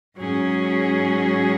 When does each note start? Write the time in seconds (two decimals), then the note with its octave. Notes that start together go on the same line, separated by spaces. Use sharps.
0.17 G#2 F#3 C#4 G#4